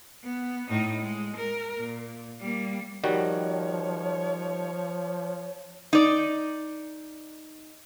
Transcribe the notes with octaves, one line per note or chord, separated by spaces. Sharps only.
B3
A2 D#4
G#3
A#4
A#2
G3 A#3
D#3 F3 G3 F#4 C#5
D#4 D5